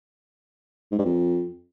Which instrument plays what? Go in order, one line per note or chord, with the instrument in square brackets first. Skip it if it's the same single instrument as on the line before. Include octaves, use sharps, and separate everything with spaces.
[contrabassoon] G#2
G2
F2